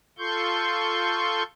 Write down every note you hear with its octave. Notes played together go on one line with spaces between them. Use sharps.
F4 A4 C6 C#6 G6